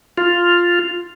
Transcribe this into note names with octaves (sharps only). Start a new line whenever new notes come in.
F4